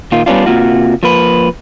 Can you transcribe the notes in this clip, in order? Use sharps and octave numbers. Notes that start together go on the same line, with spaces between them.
A#2 D#3 F4
G3 B3 C#4 D4 F4
C3 E3 A#3 F4 F#4
F3 A#3 B4